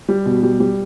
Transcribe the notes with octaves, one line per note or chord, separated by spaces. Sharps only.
G3
B2
G3
G3